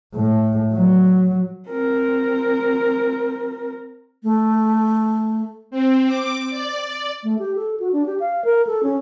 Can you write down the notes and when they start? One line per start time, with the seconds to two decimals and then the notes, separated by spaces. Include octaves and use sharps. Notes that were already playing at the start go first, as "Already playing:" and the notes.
0.15 A2
0.73 F#3
1.69 C4 A#4
4.23 A3
5.71 C4
6.07 D6
6.50 D5
7.23 A3
7.39 G4
7.56 A4
7.80 F#4
7.93 D4
8.06 G4
8.20 F5
8.45 A#4
8.67 A4
8.83 C#4